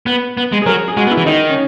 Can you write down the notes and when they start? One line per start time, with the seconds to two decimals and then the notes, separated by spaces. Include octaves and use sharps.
0.06 B3 B4
0.37 B3
0.52 G#3
0.62 G#4
0.66 F#3 A#4
0.88 G#4
0.97 G#3 F#4
1.07 B3
1.11 E4
1.17 E3
1.26 D#3 D#4
1.50 C#4